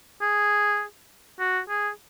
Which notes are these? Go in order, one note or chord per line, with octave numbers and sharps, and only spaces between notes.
G#4
F#4
G#4